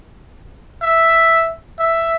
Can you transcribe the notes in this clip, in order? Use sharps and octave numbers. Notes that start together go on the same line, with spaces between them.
E5
E5